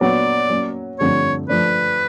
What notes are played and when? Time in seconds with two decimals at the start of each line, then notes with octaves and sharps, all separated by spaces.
0.01 A#2 F#3 B3 D4 F#4 D5
0.50 F#3 A#3 C#4
0.99 G2 D3 F3 A3 C4 C#5
1.49 F3 A3 D4 B4